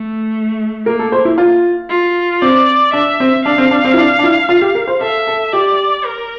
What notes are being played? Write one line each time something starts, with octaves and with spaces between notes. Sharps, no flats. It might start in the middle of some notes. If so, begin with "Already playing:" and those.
Already playing: A3
A#3 A#4
A4
C5
E4
F4
F4
C4 D5
D4 E5
C4
D4 F5
C4
D4
C4
E4
D4
D4
E4
F4
G4
A#4
C5
A4 E5
A4
G4 D5
A#4